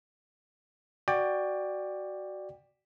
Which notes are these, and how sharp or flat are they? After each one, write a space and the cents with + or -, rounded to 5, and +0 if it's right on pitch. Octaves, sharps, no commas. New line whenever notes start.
F#4 +10 D5 +10 G5 +25